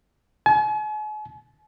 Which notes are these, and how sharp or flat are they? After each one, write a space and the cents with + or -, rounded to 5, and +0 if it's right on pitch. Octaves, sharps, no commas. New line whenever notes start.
G#5 +45